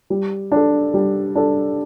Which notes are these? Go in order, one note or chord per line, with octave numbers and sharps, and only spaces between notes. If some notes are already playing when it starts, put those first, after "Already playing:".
G3
D4 A4
G3
D4 A4